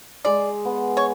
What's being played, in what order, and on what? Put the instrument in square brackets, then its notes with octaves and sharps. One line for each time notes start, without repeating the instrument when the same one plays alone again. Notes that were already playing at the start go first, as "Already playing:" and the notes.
[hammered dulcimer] G#3 [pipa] D5
[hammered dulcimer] B3
[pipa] C#5